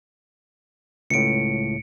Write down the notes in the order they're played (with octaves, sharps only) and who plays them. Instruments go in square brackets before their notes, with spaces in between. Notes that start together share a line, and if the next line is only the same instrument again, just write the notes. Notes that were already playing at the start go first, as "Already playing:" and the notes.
[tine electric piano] C#2 A2 [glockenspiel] C#7 D7